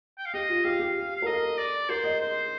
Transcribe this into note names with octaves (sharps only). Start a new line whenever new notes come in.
G5
F5
G4 D#5
F4
G4 F5
G4
F5
A#4
A4 D#5
D5
A#4 C5
D#5
C5